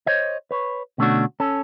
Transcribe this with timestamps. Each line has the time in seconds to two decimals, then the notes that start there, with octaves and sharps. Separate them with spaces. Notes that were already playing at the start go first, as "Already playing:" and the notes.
0.06 C5 C#5 D#5
0.51 B4 C#5
0.98 B2 D3 A3 C#4 D4 F#4
1.40 C#4 A4